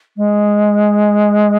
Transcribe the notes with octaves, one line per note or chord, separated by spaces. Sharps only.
G#3